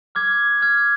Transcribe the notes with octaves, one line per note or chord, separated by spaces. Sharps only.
D6 F6 G#6
D6 F6 G#6